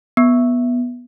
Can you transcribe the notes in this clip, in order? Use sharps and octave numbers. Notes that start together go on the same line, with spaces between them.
B3